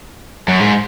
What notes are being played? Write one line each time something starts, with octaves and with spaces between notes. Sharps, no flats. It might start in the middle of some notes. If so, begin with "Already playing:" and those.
F#2
G#2